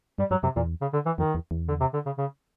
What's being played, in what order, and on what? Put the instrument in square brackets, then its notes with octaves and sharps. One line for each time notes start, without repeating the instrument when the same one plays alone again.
[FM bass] G2 [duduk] G3
[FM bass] G2 [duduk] F#3
[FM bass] F#2 [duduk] C3
[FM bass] E2 [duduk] A#2
[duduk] C#3
D3
E3
[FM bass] F2 [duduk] D#3
[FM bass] E2
E2
[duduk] D3
C3
D3
C#3
C#3